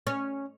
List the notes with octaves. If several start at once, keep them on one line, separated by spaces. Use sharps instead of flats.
C#4